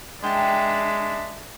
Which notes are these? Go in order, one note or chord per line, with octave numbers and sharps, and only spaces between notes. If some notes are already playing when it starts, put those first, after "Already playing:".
G#3 D4 E5 G5 A5